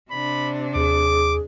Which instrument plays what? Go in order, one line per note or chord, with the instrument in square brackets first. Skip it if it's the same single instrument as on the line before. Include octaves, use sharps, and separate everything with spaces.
[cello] C3 D4 [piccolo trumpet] B5
[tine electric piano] D#2 [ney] G#4 [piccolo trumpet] D6